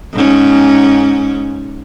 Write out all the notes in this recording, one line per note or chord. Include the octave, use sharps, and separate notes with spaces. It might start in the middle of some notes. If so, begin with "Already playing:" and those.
G#2 C#4